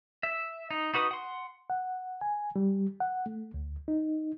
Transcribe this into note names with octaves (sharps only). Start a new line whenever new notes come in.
E5
D#4
D#4 F#4 B4 D#6
F#5 C6
F#5
G#5
G3
F#5
A3
D2
D#4